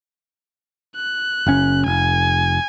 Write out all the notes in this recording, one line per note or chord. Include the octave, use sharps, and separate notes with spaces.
F#6
F#1 C#4
F1 G#5